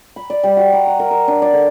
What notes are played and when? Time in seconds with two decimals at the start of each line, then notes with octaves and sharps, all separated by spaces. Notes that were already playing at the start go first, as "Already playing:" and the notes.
0.16 B5
0.30 D5
0.43 G3
0.57 F#4
0.73 A#5
0.87 F#5
1.00 A#4
1.11 A#4
1.28 D4
1.42 D5
1.53 D3